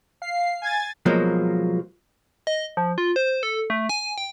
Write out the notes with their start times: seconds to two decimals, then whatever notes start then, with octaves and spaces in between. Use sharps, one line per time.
0.22 F5 C7
0.62 G#5 G#6 A6
1.06 B2 F3 F#3 G#3 A#3
2.47 D#5
2.77 F3
2.98 F4
3.16 C5
3.43 A4
3.70 A3
3.89 G#5
4.18 G5